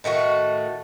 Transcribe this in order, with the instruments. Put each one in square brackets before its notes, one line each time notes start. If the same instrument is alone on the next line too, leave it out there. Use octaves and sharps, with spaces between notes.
[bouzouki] A2 D#3 A3 F#4